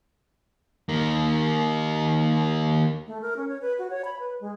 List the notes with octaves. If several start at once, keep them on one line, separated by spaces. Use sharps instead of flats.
D#3 A#3
A3
A#4
C#4
C#5
B4
F#4
C#5
B5
B4
G#3